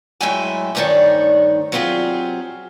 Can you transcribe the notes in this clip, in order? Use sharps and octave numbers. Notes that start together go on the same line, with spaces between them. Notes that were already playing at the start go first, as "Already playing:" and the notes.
A2 F#3 G#3 E4 G5 G#5
D2 G2 D#3 D#4 C#5 D5
F#3 C4 F4 G4 G#4